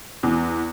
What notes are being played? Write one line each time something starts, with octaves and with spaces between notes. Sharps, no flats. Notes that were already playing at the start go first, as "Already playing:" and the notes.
E2